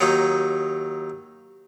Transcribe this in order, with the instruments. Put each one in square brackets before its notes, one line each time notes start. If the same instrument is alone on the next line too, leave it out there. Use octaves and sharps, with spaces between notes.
[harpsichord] D#2 F#3 D#4 A#5